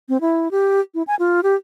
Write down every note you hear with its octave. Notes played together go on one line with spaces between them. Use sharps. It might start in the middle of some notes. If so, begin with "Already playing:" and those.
C4
E4
G4
E4
G#5
F4
G4